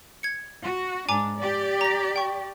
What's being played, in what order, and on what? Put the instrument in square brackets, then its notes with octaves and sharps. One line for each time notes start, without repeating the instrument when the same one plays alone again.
[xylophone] G#6 C#7
[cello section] F#4
[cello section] G#2 D4 [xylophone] G#5 A#5 D6
[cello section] G4 D5
[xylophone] A#5 A#6
G5 C#6